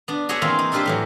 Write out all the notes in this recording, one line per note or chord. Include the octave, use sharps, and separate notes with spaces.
B3 D4
F#4 G#4 C#5 E5 F#5
E3 A#3 C4 F4
D#4
D4 E4 F4 G4 B4 C5
A2 E3 F#3